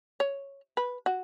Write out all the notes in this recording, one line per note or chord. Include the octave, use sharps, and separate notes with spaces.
C#5
B4
F#4